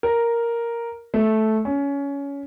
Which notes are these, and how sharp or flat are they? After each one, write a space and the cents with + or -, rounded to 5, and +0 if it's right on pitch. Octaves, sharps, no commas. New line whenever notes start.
A#4 +0
A3 -10
C#4 +20